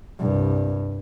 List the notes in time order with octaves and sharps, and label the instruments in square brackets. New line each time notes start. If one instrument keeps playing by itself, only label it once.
[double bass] C2 G2